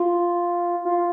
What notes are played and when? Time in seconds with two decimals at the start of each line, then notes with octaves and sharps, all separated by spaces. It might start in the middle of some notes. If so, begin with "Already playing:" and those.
Already playing: F4
0.85 F4